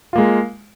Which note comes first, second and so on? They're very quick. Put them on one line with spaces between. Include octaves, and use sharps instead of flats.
F4 A#3 G#3